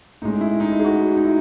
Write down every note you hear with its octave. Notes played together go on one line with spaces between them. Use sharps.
A2 G#3 C#4 D#4
E4
D#4
E4
G#4
F#4
D#4
E4